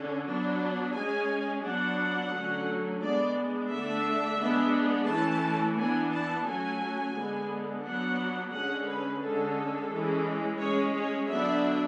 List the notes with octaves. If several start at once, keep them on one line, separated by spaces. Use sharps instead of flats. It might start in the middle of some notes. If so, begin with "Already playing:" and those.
Already playing: D3 C#4
F#3 B3 D4
G#3 C#4 G#5
F#3 B3 D4 F#5
D3 F#3 A3 C#4
G#3 B3 D4 D5
D3 A3 D4 E5
G#3 B3 D4
E3 A3 C#4 A5
E3 B3 D4 G#5
A5
F#3 A3 C#4 G#5
D3 G#3 B3
F#3 B3 D4 F#5
D3 G#3 C#4 F#5
B4
D3 G#3 C#4 A4
E3 G#3 C#4
G#3 C#4 C#5
C#5
D3 F#3 B3 D4 E5